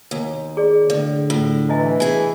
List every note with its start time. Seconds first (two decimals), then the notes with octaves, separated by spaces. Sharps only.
0.11 D#2
0.57 G#4 D5
0.90 A2 D3 D5
1.30 A2 F4
1.69 E3 E4 D#5 G#5
2.00 E4 G#4 G#5